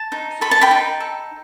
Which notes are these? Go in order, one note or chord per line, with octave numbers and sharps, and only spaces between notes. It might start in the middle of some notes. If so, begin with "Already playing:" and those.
Already playing: A5
D#4
A4 B5
A5
G5 B5
D#4
A4